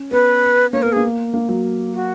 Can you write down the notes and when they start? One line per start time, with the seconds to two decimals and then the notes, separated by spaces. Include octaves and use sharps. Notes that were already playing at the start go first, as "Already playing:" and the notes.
Already playing: C#4
0.11 B3 B4
0.73 A#3 C#5
0.82 B3 A#4
0.92 A#3 G#4
1.34 A#3
1.49 F#3
1.94 F#4